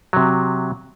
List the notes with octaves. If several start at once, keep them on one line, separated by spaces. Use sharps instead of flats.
C3 F#3